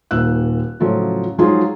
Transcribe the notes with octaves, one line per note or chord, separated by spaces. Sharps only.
D#1 D#2 E6 F#6
A2 C#3 F3 F#3 F4 A4
F3 F#3 G#3 D#4 F4 G#4